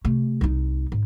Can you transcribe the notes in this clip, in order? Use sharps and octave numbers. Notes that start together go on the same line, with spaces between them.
C3 A3
C2 D#4
G#2